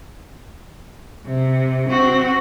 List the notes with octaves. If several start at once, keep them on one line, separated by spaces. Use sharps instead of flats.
C3
C4 F#4